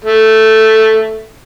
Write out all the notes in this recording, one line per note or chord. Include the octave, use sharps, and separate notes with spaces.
A3